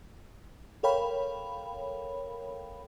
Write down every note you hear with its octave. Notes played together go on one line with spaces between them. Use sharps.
A4 A#4 C#5 F5 G5 B5